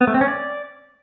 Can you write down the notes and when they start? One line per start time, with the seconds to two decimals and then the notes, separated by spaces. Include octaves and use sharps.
0.01 B3
0.07 A3
0.14 C4
0.21 C#4
0.28 D5